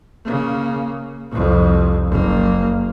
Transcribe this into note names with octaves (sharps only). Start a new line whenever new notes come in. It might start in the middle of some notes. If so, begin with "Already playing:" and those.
C#3 A#3
C2 F2
F#1 A#3